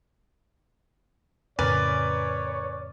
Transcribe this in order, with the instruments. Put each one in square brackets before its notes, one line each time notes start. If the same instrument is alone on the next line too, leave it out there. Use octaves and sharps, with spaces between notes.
[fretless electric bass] F2 A2 C#3 [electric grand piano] A#4 B4 G#5 [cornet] C#5 [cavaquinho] D5